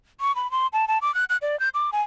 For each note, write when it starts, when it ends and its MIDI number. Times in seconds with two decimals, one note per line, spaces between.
0.20 0.34 85
0.35 0.50 83
0.51 0.67 84
0.73 0.87 81
0.88 0.98 81
1.02 1.14 86
1.14 1.24 90
1.29 1.37 90
1.42 1.58 74
1.59 1.69 91
1.74 1.90 86
1.92 2.02 80